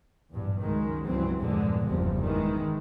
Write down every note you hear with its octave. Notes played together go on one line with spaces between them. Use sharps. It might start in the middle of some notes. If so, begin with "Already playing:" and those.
A#1 E2 G2
C#2 F#2 D#3 G#3
C#2 G2 E3 F#3 C4
E2 G2 A#2 D3 F3 G#3
F#1 E2 G2 C3 F3
D#3 E3 G#3